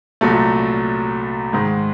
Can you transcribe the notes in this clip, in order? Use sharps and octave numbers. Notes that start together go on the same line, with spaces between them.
C2 A#2 F#3 A3
G#2 D#3 G#3